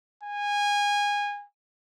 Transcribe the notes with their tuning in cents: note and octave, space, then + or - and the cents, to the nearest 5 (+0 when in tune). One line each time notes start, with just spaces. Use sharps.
G#5 -20